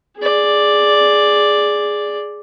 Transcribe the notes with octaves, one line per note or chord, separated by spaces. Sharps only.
G#4 D5